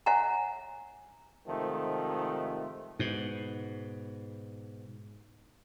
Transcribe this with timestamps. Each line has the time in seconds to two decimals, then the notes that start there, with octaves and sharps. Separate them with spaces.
0.06 C#5 E5 F#5 G#5 A#5
1.47 G#2 C3 D#3 F3 A3
2.99 G#2 B2